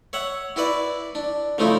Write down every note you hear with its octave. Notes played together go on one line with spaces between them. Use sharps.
C#5 E5 F#5
E4 F#4 B4 D5
D4
C#3 F3 A3 D#4 E4